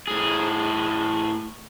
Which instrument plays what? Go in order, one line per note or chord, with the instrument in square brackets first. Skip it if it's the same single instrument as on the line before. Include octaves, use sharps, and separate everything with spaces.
[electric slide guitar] A2 G#4